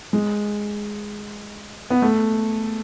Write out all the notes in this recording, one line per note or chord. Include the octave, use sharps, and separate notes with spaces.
G#3
B3
A3